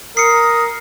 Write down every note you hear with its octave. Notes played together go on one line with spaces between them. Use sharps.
A#4 D#6 C7 C#7